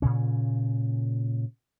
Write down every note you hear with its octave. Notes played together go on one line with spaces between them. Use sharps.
A#2 C#3 C#4